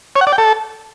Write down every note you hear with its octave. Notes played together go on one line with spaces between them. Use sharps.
C#5
F#5
D5
G5
A4